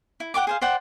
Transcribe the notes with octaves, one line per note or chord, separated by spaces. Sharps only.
E4
F#5 G5 C#6 D6
G#4 C5 F5
C5 D5 F#5 G5